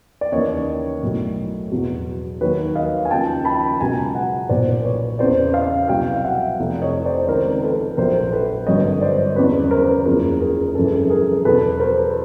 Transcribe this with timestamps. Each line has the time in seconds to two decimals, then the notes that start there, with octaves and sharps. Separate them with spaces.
0.21 D5
0.32 D#2 C#3 E3 C#5 D#5
1.03 B1 A2 F#3
1.71 E2 B2 F#3
2.41 D#2 D#3 F#3 B4 C#5
2.75 D#5 F5
3.05 G#5
3.11 D#2 C#3 F3 G5 A5
3.45 A5 B5
3.81 C#2 B2 F#3 G#5 A#5
4.15 F#5 G#5
4.49 B1 A#2 F#3 C5 D5
4.85 B4 C#5
5.19 E2 C#3 E3 C5 D5
5.54 D#5 F5
5.88 C2 B2 F#3 F5 G5
6.16 F5
6.24 E5 F#5
6.59 F1 F2 C3
6.82 C#5 D#5
7.05 C5 D5
7.28 C#2 C3 D#3 A#4 C5
7.63 A4 B4
7.97 A#1 A#2 F#3 A#4 C5
8.32 A4 B4
8.67 G#1 G2 D3 F#3 C#5 D#5
9.01 C5 D5
9.36 E2 C#3 F#3 B4 C#5
9.71 A#4 C5
10.06 F#1 E2 C#3 F3 G#4 A#4
10.40 G#4 A#4
10.75 G#1 F#2 C#3 E3 A4
10.86 G#4
10.95 A4
11.10 G#4 A#4
11.45 E2 B2 F#3 A4 B4
11.80 A#4 C5